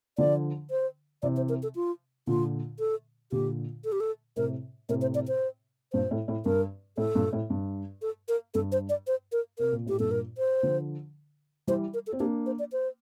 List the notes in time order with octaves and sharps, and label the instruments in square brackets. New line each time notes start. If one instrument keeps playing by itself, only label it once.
[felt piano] D3 F3 [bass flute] D5
[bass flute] C5
[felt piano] C3 E3 [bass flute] D5
[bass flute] C5
A#4
A4
F4
[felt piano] A#2 D3 [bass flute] F4
[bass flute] A4
[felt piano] A#2 D3 [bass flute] G4
[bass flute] A4
G4
A4
[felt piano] A2 C3 [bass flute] A#4
[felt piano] A2 C3 [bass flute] A#4
[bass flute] C5
D5
C5
[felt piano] G2 A#2 [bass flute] C5
[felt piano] A2
A2
[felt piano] G2 [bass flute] A#4
[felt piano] A2 [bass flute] A4
[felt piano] G2 A#2
A2
G2
[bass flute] A4
A#4
[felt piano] G2 [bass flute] A4
[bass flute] C5
D5
C5
A#4
[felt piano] C3 [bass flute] A#4
[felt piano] A#2
[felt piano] A2 [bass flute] G4
[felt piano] G2 A#2 [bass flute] A4
[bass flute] A#4
C5
[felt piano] D3 F3
[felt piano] E3 G3 [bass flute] C5
[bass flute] A#4
A4
[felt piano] C4
[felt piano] A#3 D4 [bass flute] G4
[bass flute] C5
D5
C5